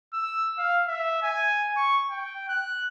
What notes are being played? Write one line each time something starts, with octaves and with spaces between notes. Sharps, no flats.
E6
F5
E5
G#5
C#6
G5
F#6